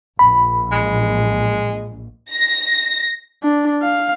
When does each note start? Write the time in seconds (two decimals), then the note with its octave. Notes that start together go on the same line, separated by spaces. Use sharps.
0.19 A#1 B5
0.72 G#3
2.31 A#6
3.43 D4
3.83 F5